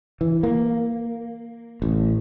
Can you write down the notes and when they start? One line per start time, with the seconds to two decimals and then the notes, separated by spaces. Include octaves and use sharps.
0.21 E3
0.43 A#3
1.82 A1